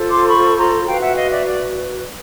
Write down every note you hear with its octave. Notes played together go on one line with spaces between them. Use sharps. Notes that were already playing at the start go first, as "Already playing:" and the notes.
Already playing: F4 A4 C5
C6 D6
B5 C#6
A#5 C6
F#4 B4 F5 G5
E5 F#5
D#5 F5
D5 E5
D5